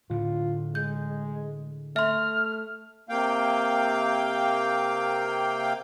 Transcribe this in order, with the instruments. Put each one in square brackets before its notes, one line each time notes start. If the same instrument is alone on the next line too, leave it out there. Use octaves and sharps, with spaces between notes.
[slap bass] A2 D3 [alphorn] F4
[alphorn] G#3 [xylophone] G6
[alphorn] A3 [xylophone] E5 C6 [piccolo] F6
[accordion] C3 A#3 F5 G5